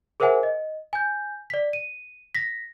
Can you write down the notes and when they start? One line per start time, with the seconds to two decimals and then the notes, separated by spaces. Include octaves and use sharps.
0.20 G#4 A#4 C5 E5 F#5 G#5
0.43 D#5
0.93 G#5 G6
1.50 D5 B6
1.73 D#7
2.35 A#6 B6